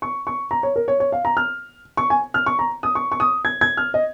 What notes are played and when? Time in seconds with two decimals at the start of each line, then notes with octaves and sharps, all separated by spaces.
0.02 C#6
0.27 C#6
0.51 A#5
0.63 C#5
0.76 A#4
0.88 C#5
1.00 C#5
1.12 F5
1.25 A#5
1.37 F6
1.97 C#6
2.10 G#5
2.34 F6
2.46 C#6
2.59 A#5
2.83 D#6
2.95 C#6
3.12 C#6
3.20 D#6
3.45 G#6
3.61 G#6
3.77 F6
3.94 D#5